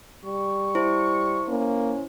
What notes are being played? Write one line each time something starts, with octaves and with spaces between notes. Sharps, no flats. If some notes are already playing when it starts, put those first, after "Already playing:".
G3 C#6
E4 C5
A#3 C#4